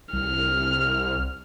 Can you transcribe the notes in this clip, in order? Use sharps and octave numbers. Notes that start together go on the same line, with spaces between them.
C2 F6